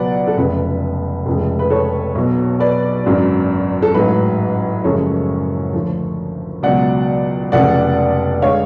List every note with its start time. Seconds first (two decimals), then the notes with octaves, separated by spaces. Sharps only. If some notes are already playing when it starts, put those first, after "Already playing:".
Already playing: C#2 B2 F#3 B4 D5 F#5
0.27 A4
0.37 F1 F2 C#3 B4
1.26 F1 F2 C#3 G#3
1.59 B4
1.70 A4 C#5
2.15 B1 B2 F#3
2.60 B4 D5
3.06 G#1 F#2 D3 F#3
3.82 A4
3.94 A1 G#2 F#3 B4
4.84 F#1 F#2 F3 G#3 A4 C#5
5.73 D2 D3 F3
6.63 C#2 B2 F#3 D5 F#5
7.52 F1 F2 C#3 D5 F#5
8.42 D3 G#3 C#5 F5